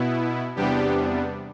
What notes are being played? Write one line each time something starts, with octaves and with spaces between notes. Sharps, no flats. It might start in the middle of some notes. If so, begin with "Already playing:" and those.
Already playing: B2 B3 E4
E2 C3 G3 B3 D4 G4